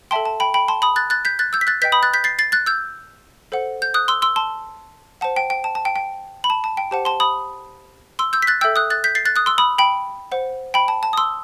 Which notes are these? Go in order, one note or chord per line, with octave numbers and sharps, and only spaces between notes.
A4 E5 G5 A5 C6
A5
G5 B5
G5 B5
A5 C6
B5 D#6
F#6 A6
F#6 A6
G6 B6
F#6 A6
E6 G6
B6
F#6 A6
B4 D#5 G5 G6 B6
B5 D#6
F#6 A6
G6 B6
A6 C7
A6 C7
F#6 A6
E6 G6
A4 C5 F#5
G6
D#6 F#6
C6 E6
C6 E6
A5 C6
C5 F#5 A5
G5
G5
A5
A5
G5
G5
B5
A5
A5
G5
G4 C5 F#5 A5
A5 C6
B5 D#6
C6 E6
E6 G6
B6
F#6 A6
A4 E5 G5 E6 G6
D#6 F#6
F#6 A6
G6 B6
A6 C7
F#6 A6
D#6 F#6
C6 E6
B5 D#6
G5 B5
C5 F#5
G5 B5
A5
A5
D#6
C6 E6